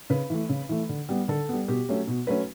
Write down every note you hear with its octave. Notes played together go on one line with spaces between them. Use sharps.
C#3 B4
E3 A3
C#3
E3 A3
D3
G3 B3
D3 A4
G3 B3
B2 G4
F#3 A3 C#4
B2
F#3 A3 C#4 B4